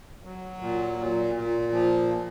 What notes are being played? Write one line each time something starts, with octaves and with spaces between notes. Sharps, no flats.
F#3
A#2
A#2
A#2
F3